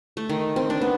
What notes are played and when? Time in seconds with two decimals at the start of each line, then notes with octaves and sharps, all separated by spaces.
0.17 A3
0.29 D#3
0.56 C4
0.70 D4
0.81 B3